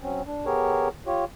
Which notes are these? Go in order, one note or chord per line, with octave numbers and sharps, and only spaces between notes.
F#3 C4 C#4
D4
B3 G4 G#4 A#4 C#5
F4 G4 C#5